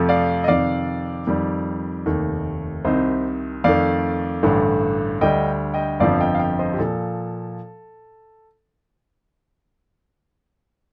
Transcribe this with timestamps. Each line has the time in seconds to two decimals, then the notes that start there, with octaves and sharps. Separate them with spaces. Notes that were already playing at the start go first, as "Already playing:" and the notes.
Already playing: F2 C3 F3 A3
0.09 D5 F5
0.44 D#5
0.48 F2 C3 D#3 D5 F5
1.27 F2 D#3 G3
2.06 F1 D#2 D#3 A3
2.85 C2 C3 D#3 C5 D#5
3.64 F2 D#3 A3 D5 F5
4.43 A1 G2 D3 A3
5.21 D2 D3 G3 D#5 G5
5.74 D#5 G5
6.00 G1 F2 D3 F3 D5 F5
6.21 D#5 G5
6.35 F5
6.39 D#5 G5
6.59 C5 D#5
6.74 G4
6.79 A#2 F3 A4